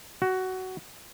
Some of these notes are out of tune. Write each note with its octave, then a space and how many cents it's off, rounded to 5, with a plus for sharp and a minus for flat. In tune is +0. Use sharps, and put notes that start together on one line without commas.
F#4 +15